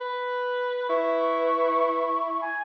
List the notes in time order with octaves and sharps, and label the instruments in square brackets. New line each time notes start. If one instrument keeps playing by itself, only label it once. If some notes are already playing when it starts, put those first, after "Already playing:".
[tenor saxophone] B4
[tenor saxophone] E4 [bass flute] B4 [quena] C#6
[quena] G#5